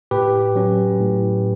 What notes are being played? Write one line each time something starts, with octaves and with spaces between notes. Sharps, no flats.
A2 G4 B4
F#3 C#4
A2